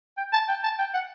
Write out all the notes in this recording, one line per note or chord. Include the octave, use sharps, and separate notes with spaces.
G5
A5
G5
A5
G5
F#5